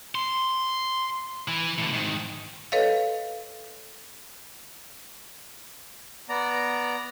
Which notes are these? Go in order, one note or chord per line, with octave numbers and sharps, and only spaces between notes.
C6
E3
A2 D3
G#2 D#3
A4 B4 C#5 D#5 F5
B3 D5 A#5